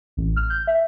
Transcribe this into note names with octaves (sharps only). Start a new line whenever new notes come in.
A1
F6
G6
E5